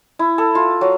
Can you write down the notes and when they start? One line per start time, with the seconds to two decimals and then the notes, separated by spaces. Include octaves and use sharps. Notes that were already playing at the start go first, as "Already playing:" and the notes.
0.19 E4
0.38 A4
0.55 F4
0.81 F#3